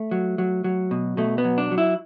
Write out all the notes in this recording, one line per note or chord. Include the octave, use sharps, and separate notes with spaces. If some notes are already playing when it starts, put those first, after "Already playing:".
Already playing: A3
F#3
F#3
F#3
B2
B2 A3
B3
F#3
D4
F#3
E4